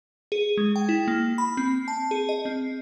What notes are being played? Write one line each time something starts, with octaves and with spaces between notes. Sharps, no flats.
G#4
G#3
G5
E4
A#3
B5
C4
A5
G#4
D#5
C4